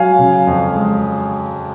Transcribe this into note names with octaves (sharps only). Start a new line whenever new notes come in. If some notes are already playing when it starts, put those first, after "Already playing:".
Already playing: F#3 F5 G#5
C#3
F2
G#3